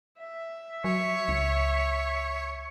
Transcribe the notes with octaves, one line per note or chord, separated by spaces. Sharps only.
E5
F#3 C#5
C#2